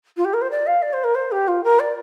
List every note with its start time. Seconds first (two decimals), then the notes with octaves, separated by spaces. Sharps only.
0.16 F4
0.24 G4
0.33 A#4
0.41 C5
0.50 D5
0.66 F5
0.82 D5
0.93 C5
1.03 A#4
1.14 C5
1.31 G4
1.47 F4
1.63 A#4
1.79 D5